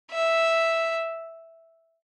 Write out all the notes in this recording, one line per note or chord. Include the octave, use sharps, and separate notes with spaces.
E5